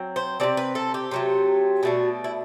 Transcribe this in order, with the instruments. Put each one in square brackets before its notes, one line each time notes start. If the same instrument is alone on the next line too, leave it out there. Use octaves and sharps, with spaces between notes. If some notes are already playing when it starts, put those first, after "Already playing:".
Already playing: [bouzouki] F#3 C4
C5
C3 F#3 C4 D5
B4
A4
G4
C3 F#3 A3
B2 A3 D4 F#4
E4